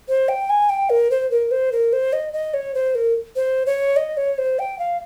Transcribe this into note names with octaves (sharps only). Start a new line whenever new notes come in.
C5
G5
G#5
G5
A#4
C5
A#4
C5
A#4
C5
D#5
D#5
C#5
C5
A#4
C5
C#5
D#5
C#5
C5
G5
F5